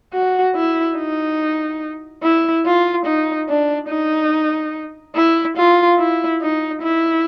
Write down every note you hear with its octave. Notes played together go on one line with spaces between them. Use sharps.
F#4
E4
D#4
E4
F4
D#4
D4
D#4
E4
F4
E4
D#4
E4